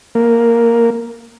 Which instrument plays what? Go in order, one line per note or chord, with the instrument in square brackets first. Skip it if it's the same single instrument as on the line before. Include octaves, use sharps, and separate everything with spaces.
[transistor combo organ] A#3